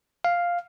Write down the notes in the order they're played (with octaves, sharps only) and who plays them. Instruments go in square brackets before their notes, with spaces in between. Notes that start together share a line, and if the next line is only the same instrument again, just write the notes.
[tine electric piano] F5